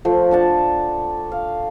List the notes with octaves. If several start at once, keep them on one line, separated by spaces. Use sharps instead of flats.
F3 A3 C6
D4 F#5 A5
F5